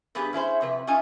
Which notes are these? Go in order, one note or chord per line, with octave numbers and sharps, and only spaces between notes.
G2 B3 G4 G#4 B4
C#4 E4 G#4 C5
F2 C3 B4
C#4 D#4 F4 E5 G#5